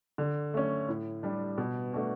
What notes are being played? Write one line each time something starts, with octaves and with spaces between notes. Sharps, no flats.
D3
A3 C#4
A2
G3 D4 G4
B2
A3 D4 F#4